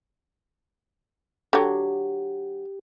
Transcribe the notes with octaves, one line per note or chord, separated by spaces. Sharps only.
D3 F#3 G4